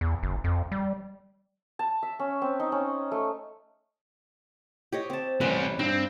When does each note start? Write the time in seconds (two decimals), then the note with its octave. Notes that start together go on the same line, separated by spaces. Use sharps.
0.01 E2
0.23 F#1
0.44 F2
0.72 G3
1.79 A5
2.03 E5
2.19 C#4
2.42 C4
2.60 D#4
2.72 C#4
3.12 A3
4.92 G4 C#5 D#5
5.10 C4 A5
5.41 A1 C3 G3 B4 G#5 C6
5.79 G2 C4 G5 A#6